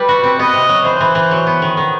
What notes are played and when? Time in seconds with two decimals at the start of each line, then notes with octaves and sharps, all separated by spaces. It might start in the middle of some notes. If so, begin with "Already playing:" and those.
Already playing: G3 B4
0.09 F#4
0.23 C4
0.39 B3 D#5
0.54 C3
0.69 F#3
0.84 E3 C5
1.01 E3
1.15 E3
1.31 F#3
1.47 B3
1.62 D#3
1.77 D#3